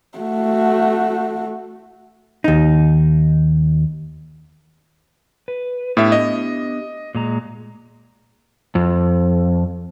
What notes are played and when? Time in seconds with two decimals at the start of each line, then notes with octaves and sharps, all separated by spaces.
0.18 A3 F#4
2.44 D#2 D#4
5.48 B4
5.97 A2 B3 D4 G4 E5
6.12 D#5
7.15 A#2 G#3 A#5
8.75 F2